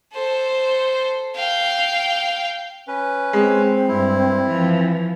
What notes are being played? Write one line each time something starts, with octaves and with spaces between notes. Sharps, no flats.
A4 C5
F5 G5
C#4 B4
G#3 C4
G2 E4
E3 F3